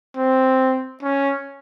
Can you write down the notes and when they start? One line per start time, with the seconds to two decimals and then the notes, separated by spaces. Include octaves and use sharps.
0.17 C4
1.03 C#4